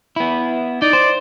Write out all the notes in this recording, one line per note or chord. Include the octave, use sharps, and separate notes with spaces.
B3 E4
D#4 D5
C5